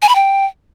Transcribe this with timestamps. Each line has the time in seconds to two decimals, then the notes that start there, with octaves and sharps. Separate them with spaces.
0.02 G#5
0.09 B5
0.15 G5